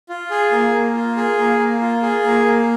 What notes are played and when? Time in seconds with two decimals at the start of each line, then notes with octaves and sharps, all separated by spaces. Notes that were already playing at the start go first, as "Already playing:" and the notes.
0.09 F4
0.31 G#4
0.52 A#3
0.73 A#3
0.95 F4
1.17 G#4
1.38 A#3
1.59 A#3
1.81 F4
2.02 G#4
2.24 A#3
2.46 A#3